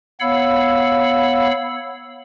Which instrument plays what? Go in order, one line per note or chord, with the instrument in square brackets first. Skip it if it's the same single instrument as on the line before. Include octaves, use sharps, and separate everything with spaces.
[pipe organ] B3 C#5 F5 F#5 B5 E6